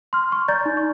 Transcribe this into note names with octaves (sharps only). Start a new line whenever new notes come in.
C6 F6
C6 C#6
D5 A#5 G6 A6
D#4
C#6